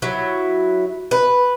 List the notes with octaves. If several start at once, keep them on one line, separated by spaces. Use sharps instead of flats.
F#3 E4
B4